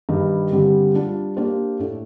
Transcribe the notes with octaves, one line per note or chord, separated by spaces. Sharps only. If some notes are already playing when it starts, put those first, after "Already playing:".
G2 D#3 G3
G2 D3 G3 C4 G4
G3 D4 F4
A#3 D4 G4 C5
A2 A3 D4 A4